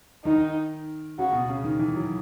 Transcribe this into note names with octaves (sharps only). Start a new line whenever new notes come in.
D#3 D#4
C#3 F#4
B2
C#3
D#3
E3
F#3